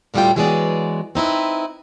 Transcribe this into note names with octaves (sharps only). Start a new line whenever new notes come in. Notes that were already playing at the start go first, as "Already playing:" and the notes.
D2 A2 G3 D4 F4 G5
E3 F#3 G#3 B3 G#4 D5
C4 D#4 E4 B4